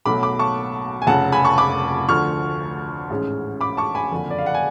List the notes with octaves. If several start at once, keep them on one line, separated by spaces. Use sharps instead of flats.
B1 B2 F#3 A3 B5 D6
B5 D6
A5 C#6
G#5
F1 F2 C#3 F#5 A5
G#5 B5
A5 C#6
B5 D6
D2 D3 F3 C#6 F6
A1 G#2 G#3 C#4
B5 D6
A5 C#6
G#5 B5
F#1 F2 D3
D5
F5
F#5
G#5